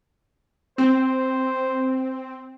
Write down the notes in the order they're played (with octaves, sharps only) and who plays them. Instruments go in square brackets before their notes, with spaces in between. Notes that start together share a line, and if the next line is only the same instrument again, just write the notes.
[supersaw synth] C4 [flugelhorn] C5